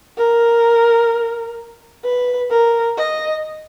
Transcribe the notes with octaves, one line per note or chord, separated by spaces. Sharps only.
A#4
B4
A#4
D#5